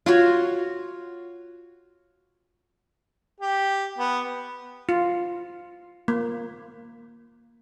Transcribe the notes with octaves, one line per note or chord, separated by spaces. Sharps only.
F4 F#4 C#5
G4
B3
F4
A#3